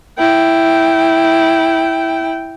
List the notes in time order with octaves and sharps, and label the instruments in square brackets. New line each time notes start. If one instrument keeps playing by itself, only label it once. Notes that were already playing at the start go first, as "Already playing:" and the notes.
[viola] E4 G5